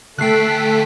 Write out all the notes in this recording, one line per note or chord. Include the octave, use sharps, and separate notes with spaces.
D2 A3 A4 G5 F#6 B6 C7